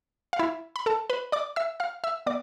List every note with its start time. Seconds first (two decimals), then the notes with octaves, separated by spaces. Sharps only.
0.33 F5
0.39 E4 E5
0.76 B5
0.86 A4 A5
1.10 B4 B5
1.32 D5 D6
1.56 E5 E6
1.80 F5 F6
2.04 E5 E6
2.26 B3 D5 D6